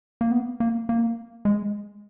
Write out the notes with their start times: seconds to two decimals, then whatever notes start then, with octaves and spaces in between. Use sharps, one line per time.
0.21 A#3
0.32 B3
0.60 A#3
0.89 A#3
1.45 G#3